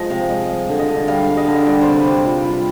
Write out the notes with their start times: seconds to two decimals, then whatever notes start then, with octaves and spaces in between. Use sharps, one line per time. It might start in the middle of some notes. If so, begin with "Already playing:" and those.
Already playing: F3 G#3 D#5
0.10 C3 F5
0.29 G#3 D#5
0.49 G3 F5
0.69 D3
0.79 D#5
0.89 D3
1.08 G3 F5
1.28 G3
1.37 D#5
1.47 D3
1.66 G3 D5
1.81 C3 C5
1.96 B4
2.05 C3
2.11 G4
2.25 G3 F4
2.45 G3 F4